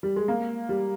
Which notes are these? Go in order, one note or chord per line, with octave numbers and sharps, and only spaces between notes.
G3
G#3
A#3
G3